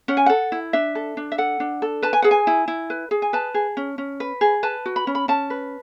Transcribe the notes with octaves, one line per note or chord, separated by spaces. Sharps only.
C#4 F#5
G#5
A4 F#5
E4
D4 E5
A4
D4
E5
A4 F#5
D4
A4
B4 A5
G#5
G#4 F#5
G#5
E4
E4
B4
G#4
G#5
B4 A5
G#4
C#4
C#4
B4
G#4
B4 A5
F#4
B5
C#4
B5
C#4 A5
B4